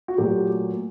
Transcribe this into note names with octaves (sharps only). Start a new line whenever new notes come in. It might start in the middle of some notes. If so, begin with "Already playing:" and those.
F#4
A#2 F#3 A3 G4